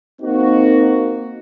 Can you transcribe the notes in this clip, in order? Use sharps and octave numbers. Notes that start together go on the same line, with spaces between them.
A#3 C4 D#4 F#4